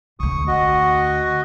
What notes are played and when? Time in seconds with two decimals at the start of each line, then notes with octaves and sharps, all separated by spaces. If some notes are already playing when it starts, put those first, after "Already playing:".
0.20 D2 D3 C#6 D#6
0.47 F#4 D#5